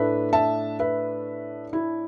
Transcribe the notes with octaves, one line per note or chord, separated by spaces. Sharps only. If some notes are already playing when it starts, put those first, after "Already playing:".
Already playing: A2 A3 D4 B4 E5
E5 A5
B4 E5
E4